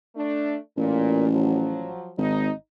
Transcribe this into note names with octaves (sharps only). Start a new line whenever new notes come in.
A3 D4
A1 A#2
F3 F#3
G#1 D#4